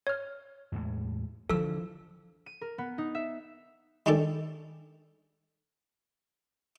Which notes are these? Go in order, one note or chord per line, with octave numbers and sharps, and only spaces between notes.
C#5 F6
E2 A2 G#3
D3 E3 F3 A4 E6
D#7
A#4
B3
D#4
E5
D#3 G#3 C#4 D4 G4 A4